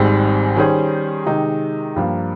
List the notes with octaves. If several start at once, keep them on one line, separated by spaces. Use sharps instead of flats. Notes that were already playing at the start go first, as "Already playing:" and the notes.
Already playing: G#1 G#2 G3 C4
D#3 G3 C#4 G#4 C5
C3 D#3 G#3 D#4
G2 F3 A#3